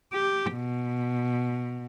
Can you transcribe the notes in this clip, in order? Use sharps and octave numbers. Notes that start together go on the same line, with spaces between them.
G4
B2